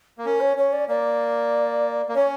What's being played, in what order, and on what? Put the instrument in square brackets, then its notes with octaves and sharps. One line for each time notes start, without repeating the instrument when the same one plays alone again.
[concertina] A#3
[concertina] C#4 [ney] A#4
[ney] C#5
[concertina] C#4 [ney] C#5
[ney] D5
[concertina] A#3 [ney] D5
[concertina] A#3
[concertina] C#4 [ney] C#5